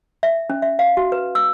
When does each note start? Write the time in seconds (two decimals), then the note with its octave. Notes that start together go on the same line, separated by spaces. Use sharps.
0.23 E5
0.50 C#4
0.62 E5
0.79 F5
0.97 F#4
1.12 B4
1.35 E6